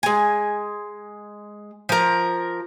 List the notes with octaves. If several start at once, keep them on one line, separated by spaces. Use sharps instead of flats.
G#3 G#5
F3 A#4